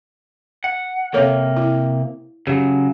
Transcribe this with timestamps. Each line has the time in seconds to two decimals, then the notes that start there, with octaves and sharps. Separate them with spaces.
0.64 F#5
1.14 C3 A#3 A4 C#5 F5
1.57 E4
2.47 C#3 F#3 G4